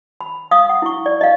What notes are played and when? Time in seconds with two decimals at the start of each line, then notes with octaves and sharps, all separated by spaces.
0.21 B5
0.51 F5 D#6
0.69 F#5
0.82 E4 C#6
1.06 D5
1.21 D#5 F5